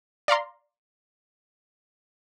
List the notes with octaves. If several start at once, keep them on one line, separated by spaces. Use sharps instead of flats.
D5 F5 A#5 C6